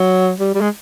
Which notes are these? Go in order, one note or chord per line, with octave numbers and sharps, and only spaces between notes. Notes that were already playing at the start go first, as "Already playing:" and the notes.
Already playing: F#3
G3
G3
G#3